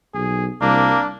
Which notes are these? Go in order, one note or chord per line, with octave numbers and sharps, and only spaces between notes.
B1 G#4
C2 A#3 D4